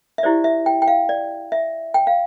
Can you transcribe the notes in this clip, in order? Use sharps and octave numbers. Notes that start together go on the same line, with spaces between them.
E5
E4 G4 C5 D5
E5
G5
G5
F5
D5
E5
G5
F5